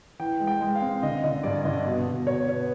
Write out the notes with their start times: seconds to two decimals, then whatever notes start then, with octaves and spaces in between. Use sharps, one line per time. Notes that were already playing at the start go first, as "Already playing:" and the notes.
0.20 E3 G5
0.40 G#3
0.47 G5
0.61 G#3
0.75 F5
0.82 C4
1.03 D3 D#5
1.24 D3 D#5
1.43 G2 D5
1.64 D3 D#5
1.85 B2
2.07 B2
2.27 B2 C#5
2.48 B3